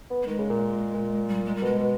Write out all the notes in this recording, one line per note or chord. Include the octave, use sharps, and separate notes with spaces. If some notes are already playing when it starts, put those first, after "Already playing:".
B3
A#3
D#3 G#3
C#3
A#2
A#2
G3
G#3
G3
B2 G#3
B2